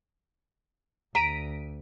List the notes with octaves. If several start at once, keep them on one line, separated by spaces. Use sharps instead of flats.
D2 A#5 B6 D7 D#7